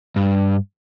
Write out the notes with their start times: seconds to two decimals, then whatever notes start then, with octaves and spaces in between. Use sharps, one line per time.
0.16 G2